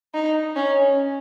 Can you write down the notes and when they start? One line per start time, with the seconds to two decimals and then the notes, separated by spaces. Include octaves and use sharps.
0.14 D#4
0.56 C#4